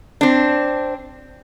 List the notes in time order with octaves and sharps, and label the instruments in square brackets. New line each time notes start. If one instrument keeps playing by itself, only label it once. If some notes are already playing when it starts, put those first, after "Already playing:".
[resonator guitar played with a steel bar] C4 D4